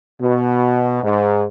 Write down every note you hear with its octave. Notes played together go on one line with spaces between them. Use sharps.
B2
G#2